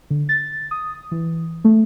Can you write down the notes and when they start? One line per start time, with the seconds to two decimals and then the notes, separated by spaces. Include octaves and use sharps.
0.10 D3
0.29 A6
0.71 D#6
1.11 E3
1.65 A3